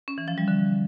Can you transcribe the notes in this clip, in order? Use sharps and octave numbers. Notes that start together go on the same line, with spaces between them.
C#4
E3
F3
G3
D3